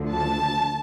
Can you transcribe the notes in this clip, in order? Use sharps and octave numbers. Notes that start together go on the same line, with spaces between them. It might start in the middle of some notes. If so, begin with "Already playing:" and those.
Already playing: D2 D3 F3
A5